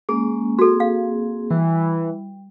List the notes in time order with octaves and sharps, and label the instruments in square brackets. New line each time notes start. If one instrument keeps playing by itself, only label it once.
[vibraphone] G#3 A#3 C#4 [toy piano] G#4
[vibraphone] A#3 C4 G#4 [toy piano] F#4 A4
[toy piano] F5
[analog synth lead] E3 [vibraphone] G3